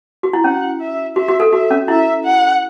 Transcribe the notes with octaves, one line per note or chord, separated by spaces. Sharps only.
F#4
E4
C#4 F#5
E5
F#4 E5
F#4
A4
F#4 E5
C#4
E4 E5
F#5